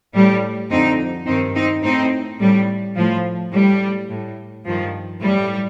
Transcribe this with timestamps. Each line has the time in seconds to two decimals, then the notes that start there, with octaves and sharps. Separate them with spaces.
0.14 A2 G3
0.71 F2 D3 C4 D#4
1.27 G2 D#3 C4 D#4
1.55 C4 D#4
1.83 A2 C4 D#4
2.40 A2 G3
2.96 A2 F3
3.53 A2 G3
4.09 A2
4.65 G2 D#3 F3
5.21 A2 G3